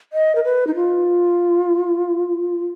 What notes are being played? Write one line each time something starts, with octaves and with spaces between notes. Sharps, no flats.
D#5
A#4
B4
D#4
F4